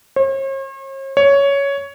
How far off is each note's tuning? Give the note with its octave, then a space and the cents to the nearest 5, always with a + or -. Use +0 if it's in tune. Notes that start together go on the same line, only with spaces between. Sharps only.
C#5 -45
C#5 +10